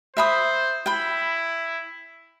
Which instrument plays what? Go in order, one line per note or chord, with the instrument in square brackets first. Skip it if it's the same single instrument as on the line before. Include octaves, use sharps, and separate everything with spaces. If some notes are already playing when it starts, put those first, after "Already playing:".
[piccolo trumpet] C5 [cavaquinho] E5 B5 D#6
[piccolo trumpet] E4 [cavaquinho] G5 B5